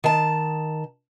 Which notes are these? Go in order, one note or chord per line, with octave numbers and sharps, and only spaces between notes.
D#3 A5